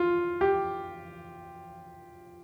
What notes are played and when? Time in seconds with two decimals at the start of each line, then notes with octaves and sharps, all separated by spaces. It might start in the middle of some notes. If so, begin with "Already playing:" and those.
Already playing: F4
0.41 G4